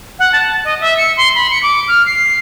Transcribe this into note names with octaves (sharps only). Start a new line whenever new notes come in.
F#5
A5
D#5
E5
C#7
C6
B5
C#7
D6
F6
C7